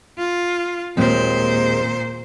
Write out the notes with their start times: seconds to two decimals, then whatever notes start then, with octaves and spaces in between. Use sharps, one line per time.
0.18 F4
0.97 D#2 A#2 G#3 C4 C5